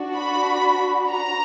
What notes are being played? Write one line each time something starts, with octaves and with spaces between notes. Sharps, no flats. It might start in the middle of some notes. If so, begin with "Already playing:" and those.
Already playing: D4 F#4
B5
A#5